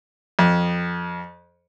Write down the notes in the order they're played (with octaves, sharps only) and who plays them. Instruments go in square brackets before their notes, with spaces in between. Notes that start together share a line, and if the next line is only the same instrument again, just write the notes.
[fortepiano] F2